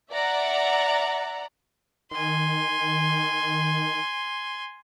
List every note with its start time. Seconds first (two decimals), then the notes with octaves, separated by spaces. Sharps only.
0.12 D5 E5 F#5 A#5
2.11 D#3 G#5 C6